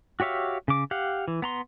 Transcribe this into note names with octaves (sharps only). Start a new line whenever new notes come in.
F#4 G4 C#5 E5 F5
C#3 D6
G4 F5 F#5
E3
B3 A#5 C6